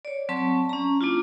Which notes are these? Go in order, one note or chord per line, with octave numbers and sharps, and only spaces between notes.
C#5 D5
F#3 C4 A5 C#6
C#4 A#5
A#3 D4 E4 F4